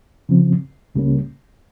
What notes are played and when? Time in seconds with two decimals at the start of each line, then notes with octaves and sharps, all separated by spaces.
0.29 C#3 F3 C4
0.95 C#2 C#3 G3 A#3 C#4